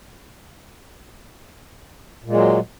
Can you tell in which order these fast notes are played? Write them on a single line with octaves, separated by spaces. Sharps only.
A#2 G#3 F#3